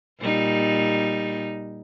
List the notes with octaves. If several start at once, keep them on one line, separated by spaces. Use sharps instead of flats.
A#2 G3 D#4